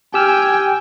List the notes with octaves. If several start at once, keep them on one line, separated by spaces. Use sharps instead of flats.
G4 G5 G#5 E6 F6